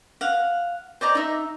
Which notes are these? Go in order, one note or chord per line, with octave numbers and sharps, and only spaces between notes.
F5 F#5
C5 D5 D#5 A#5
D#4 E5